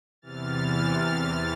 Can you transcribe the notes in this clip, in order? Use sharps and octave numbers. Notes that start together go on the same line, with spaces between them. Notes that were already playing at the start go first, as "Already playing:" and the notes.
E2 C3 E3 F6 A6